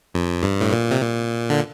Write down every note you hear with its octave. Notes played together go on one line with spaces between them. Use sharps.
F2
G2
A2
A#2
C3
A#2
D3